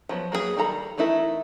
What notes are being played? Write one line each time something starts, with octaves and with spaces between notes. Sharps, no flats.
F3 F#3 B3
F#3 A#3 C4 G#4 B4
D#3 G3 A4 A#5 B5
E3 A3 D#4 E4 A#4